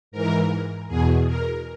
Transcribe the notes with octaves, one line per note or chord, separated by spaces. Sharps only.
G#2 E3 A#4
E2 B2 G#4
A#4